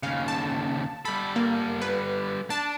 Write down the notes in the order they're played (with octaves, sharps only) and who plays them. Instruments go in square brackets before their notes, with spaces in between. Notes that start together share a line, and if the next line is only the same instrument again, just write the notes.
[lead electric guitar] D#2 C#3 [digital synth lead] F5
[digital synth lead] A5
[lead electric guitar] G3 A4 [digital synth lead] B5
[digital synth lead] A#3
B4
[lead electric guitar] D4 [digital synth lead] A5